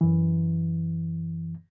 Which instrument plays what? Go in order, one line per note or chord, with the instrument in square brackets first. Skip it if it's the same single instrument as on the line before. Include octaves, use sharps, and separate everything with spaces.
[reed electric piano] F#2 E3